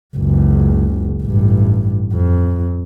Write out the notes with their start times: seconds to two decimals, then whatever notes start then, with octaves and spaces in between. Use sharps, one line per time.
0.17 F#1 C#2
1.23 A1 G2
2.12 F2